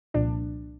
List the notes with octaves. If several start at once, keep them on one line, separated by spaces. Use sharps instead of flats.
C2 A#2 F3 D4